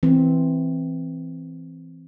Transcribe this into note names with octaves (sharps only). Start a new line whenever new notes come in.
E3 C4